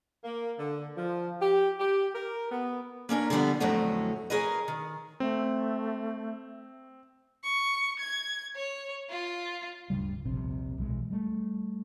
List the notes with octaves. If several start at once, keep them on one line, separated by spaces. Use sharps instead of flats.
A#3
D3
F3
G4
G4
A#4
B3
A#3 C#4 D4 A#4
D3 F3 G3 B3
F2 A2 D3 F#3 A3 C#4
C#4 G#4 A#4 B4 D#5
D#3
A3 C4
C#6
G#6
C#5
F4
D1 G2 C#3 G3
D#1 A#1 C3 C4
B1 E3 G#3
G3 A3